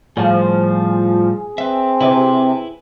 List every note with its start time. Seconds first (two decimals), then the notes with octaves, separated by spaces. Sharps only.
0.17 A2 F3 G3 G#4
1.58 C4 B4 E5
2.01 C3 E4 B4